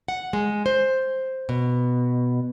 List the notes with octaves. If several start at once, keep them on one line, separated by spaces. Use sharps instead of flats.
F#5
G#3
C5
B2